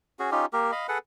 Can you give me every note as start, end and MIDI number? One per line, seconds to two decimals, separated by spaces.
0.19 0.30 61
0.19 0.30 66
0.19 0.30 68
0.32 0.46 61
0.32 0.46 63
0.32 0.46 65
0.32 0.46 67
0.53 0.71 58
0.53 0.71 67
0.53 0.71 70
0.72 0.87 75
0.72 0.87 77
0.72 0.87 83
0.88 0.98 68
0.88 0.98 69
0.88 0.98 71
0.88 0.98 78